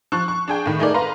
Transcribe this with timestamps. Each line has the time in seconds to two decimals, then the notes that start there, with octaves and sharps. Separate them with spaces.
0.12 F3 C#6 F#6
0.28 C#6
0.48 D4 G#4 G5
0.66 A2 D#3
0.79 A3 D#4 G#4 A#4 D5
0.94 B4 F5 A#5 C6